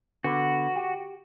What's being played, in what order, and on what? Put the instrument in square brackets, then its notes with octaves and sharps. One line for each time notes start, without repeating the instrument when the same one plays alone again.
[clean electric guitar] D3 B3 [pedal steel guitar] F#4
[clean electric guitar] G4